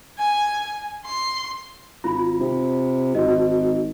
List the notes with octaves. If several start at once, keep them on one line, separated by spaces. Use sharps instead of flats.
G#5
C6
G#1 F4 B5
C3
G#1 F#4 D#5